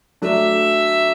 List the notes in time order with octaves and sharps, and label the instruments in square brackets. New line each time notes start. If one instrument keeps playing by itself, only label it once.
[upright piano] F#3 A3 D4 [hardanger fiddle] E5